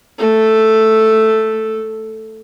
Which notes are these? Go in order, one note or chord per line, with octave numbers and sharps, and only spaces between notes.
A3 A4